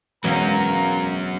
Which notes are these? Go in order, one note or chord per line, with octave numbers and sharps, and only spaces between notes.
E1 F#3 C#4 A#4 F5 A#5